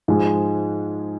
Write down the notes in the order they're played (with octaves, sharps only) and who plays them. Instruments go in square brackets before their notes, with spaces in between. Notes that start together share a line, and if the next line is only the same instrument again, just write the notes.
[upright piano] G#2 F3 G#3